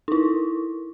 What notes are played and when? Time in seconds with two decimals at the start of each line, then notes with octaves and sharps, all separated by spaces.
0.08 D#4 E4